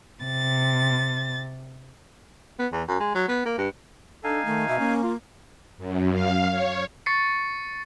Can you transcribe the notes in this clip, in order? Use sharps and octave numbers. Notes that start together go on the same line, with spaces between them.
C3 A6
B3
E2
F#2
G#3
F#3
B3
A#3
G2
D4 D#4 A4 F5 G#5
D#3 A3
B2 E5
A#3 C#4
F4
F#2
F5
C#5
C#6 A6 C7 C#7